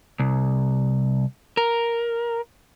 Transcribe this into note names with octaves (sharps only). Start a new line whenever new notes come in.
C2
A#4